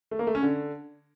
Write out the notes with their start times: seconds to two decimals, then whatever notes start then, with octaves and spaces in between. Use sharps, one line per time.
0.11 A3
0.19 A#3
0.27 A3
0.35 C#4
0.43 D3